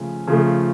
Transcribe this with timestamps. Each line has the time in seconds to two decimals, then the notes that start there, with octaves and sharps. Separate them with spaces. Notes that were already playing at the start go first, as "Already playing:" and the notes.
Already playing: C#3 F3 A3
0.27 C#3 F3 A3